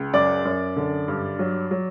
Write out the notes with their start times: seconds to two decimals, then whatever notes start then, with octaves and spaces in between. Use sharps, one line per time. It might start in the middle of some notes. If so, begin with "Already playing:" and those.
Already playing: C#2
0.13 F#2 D5
0.45 F#2
0.76 D3
1.08 G2
1.39 F#3
1.71 F#3